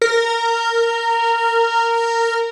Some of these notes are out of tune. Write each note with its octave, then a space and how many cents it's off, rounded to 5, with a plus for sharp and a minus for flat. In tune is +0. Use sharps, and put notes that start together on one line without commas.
A#4 -15